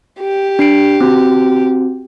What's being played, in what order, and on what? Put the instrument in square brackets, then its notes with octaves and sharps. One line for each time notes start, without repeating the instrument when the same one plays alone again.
[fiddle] G4
[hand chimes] D4 C7 D7
C4 F#4